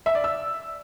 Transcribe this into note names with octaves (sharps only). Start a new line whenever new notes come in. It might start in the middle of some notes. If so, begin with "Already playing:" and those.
E5
D5
E6